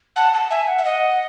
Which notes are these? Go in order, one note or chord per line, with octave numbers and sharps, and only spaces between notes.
F#5 A5
A5
E5 G#5
F#5
E5
D#5 F#5